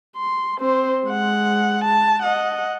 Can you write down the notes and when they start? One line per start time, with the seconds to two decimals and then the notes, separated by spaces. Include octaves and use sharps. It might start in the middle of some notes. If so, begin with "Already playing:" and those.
0.16 C6
0.59 C4 C5
1.07 G#3 F#5
1.84 A5
2.23 D#5 F#5